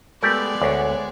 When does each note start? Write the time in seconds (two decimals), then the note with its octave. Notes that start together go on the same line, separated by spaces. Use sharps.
0.23 G#3 A3 B3 G4 A#4 B4 D5
0.62 D2 C#5 F#5